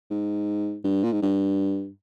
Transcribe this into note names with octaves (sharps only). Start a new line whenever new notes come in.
G#2
G2
A#2
G#2
G2